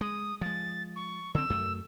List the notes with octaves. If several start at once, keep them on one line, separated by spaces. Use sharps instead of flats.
G#3 D#6
F3 G#3 A6
C#6
D3 C4 E6
F#2 A3